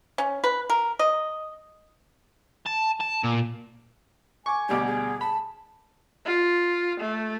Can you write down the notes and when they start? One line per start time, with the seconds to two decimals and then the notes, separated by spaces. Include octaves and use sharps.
0.18 C#4
0.44 B4
0.70 A#4
0.99 D#5
2.66 A5
3.00 A5
3.23 A#2
4.46 G#5 C#6 D6
4.69 D2 B2 G3 G4
4.87 G#4
5.21 A5 B5
6.25 F4
7.00 A3